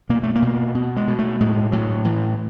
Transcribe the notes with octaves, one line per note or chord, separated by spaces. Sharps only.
B2 A#3
A3
A#3
B2
B2
G#3
B2
A3
A2 G#3
A2 F#3
A2 E3